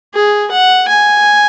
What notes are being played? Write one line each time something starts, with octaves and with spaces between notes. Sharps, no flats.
G#4
F#5
G#5